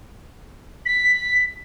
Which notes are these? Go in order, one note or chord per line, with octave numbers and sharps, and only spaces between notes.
B6